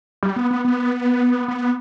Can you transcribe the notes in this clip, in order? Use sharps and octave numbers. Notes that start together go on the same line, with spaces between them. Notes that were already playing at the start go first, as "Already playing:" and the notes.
G3
B3
B3
B3
B3